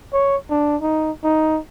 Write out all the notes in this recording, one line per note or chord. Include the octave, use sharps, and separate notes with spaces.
C#5
D4
D#4
D#4